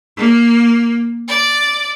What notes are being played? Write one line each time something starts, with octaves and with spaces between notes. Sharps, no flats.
A#3
D5